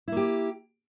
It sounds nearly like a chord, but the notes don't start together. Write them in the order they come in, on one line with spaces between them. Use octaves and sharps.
E4 A#3 G4